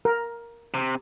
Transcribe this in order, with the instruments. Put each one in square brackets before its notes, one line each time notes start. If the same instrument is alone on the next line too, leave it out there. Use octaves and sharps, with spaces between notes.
[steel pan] A#4
[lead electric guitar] C3